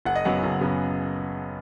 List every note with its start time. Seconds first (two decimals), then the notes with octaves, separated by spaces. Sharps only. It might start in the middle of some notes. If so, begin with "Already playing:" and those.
0.05 F#1 F#5
0.15 D#5
0.25 F#2 C#3 F#3 B3 F#5
0.43 F#1
0.61 F#2 C#3 F#3 B3